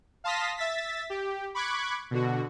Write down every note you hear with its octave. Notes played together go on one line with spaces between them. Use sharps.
F5 A5 C6 D#6 A#6 B6
E5 A6 B6
G4
B5 C#6 D6 F#6 G#6
B2 D3 F#4